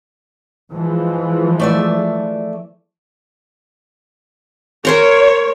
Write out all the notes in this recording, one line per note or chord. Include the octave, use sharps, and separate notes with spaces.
E3 F3 G#3
A3 D5 E5
A#4 C5 C#5 A#5